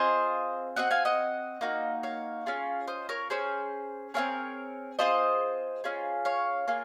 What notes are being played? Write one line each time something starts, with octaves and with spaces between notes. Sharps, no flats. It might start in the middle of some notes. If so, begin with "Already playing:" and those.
Already playing: C4 F4 G#4 C5 D#5
C4 F#4 D#5 F#5
F5 G#5
D#5 F#5
A#3 D#4 F#4
C#5 F5
C#4 F4 G#4
C5 D#5
A#4 C#5
C#4 G#4 C5
C4 F4 G#4 A#4 C#5
C4 F4 G#4 C5 D#5
C#4 F4 G#4
C#5 F5
A#3 F4 G#4